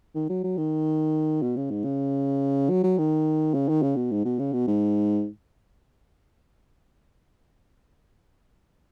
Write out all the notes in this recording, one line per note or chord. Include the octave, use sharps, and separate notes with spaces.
D#3
F#3
F#3
D#3
B2
C#3
G#2
C#3
F#3
F#3
D#3
C#3
D#3
C#3
B2
G#2
B2
C#3
B2
G#2